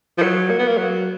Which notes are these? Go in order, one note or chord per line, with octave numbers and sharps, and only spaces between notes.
F3
F#3
A#3
B3
A#3
F#3